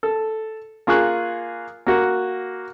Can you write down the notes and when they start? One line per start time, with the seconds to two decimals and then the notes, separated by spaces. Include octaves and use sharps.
0.03 A4
0.87 A#3 F4 G#4 C#6 F#6
1.87 A#3 F#4